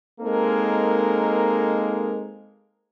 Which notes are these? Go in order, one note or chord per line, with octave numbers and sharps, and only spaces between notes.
G#3 A#3 C4 D#4 A4 A#4